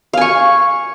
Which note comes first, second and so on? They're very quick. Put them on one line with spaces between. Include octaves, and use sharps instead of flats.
F5 G#5 C#6